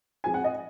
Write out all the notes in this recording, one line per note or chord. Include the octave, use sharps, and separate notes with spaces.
F2 F3 G#3 G#5
F#5
D#5